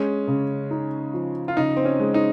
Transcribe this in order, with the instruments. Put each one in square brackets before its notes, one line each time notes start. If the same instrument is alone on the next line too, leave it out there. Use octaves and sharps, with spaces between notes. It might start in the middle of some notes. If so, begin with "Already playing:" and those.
Already playing: [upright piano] G#3 [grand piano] C#4
[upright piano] C#3
D#4
F3
[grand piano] F4
[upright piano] C#3 [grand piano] D#4
[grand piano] C4
C#4
[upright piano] G#3
[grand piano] D#4